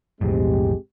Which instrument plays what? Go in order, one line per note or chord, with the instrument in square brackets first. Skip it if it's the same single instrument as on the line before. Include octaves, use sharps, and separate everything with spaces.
[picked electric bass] B1 F2 A2 [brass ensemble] G#3 C4 G4